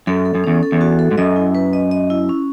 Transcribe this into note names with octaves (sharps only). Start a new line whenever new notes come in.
F#2 A4
A4
F#2
E2 C#4
A4
E2
F#4
A4
G#2
F#2 D#5
E4
B4
D#5
D#5
E4
C#4